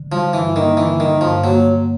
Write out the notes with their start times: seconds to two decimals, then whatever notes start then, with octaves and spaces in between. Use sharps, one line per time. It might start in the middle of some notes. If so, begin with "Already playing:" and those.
Already playing: D3
0.12 F3 G3
0.33 G2 E3
0.56 D#3 A#3
0.77 D3 E3
0.99 D#3 G3
1.21 G2 F3
1.44 F#3 A#3